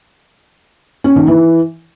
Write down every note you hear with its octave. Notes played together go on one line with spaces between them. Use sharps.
C#4
D#3
E3